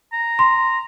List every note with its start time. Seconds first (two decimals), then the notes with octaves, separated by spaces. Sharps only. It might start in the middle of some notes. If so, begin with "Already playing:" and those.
0.13 A#5
0.39 C6